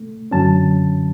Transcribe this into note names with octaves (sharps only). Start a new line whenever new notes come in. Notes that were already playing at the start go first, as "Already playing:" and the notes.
Already playing: A3
F#2 D3 F#3 C#4 A5